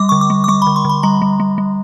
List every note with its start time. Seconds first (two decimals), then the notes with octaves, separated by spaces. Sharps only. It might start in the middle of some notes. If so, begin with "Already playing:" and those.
Already playing: G3 D6
0.09 D3 C#6
0.21 D6
0.30 G3
0.44 D6
0.48 G3 C#6
0.62 B5
0.67 D3
0.76 C6
0.85 D3 B5
1.03 G3 A#5
1.22 G3
1.40 G3
1.58 G3